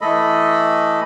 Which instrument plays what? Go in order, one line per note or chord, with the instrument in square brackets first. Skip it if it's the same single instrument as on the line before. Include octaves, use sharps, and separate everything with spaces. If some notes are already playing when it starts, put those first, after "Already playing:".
[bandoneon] E3 A3 A4 D#5 B5